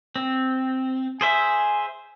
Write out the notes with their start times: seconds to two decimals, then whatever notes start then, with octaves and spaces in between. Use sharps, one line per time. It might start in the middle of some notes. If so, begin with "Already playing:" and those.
0.16 C4
1.21 G#4 C5 E5 G#5